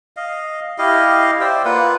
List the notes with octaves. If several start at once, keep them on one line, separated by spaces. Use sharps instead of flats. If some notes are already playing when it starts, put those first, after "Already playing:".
D#5 F5
E4 G4 D#5 F5
C5 D5 E5 G5
A#3 F4 B4 F#5